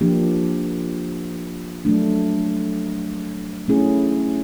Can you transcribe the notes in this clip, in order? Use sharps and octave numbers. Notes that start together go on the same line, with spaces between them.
F3 A#3 D4 G4
F#3 A3 D4
A3 C#4 E4 G#4